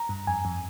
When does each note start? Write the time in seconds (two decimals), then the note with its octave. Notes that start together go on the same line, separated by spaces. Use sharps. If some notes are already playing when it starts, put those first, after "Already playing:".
Already playing: A#5
0.09 G2
0.27 F2 G#5
0.45 F2